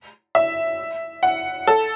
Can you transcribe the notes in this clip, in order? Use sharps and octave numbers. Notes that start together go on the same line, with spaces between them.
E5
F#5
A4